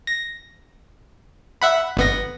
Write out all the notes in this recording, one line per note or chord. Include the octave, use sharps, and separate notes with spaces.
A#6
E5 F#5 B5
G1 B3 A#6